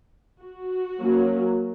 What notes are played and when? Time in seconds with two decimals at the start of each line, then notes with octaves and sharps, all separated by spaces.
0.41 F#4
1.00 F#3 A#3 C#4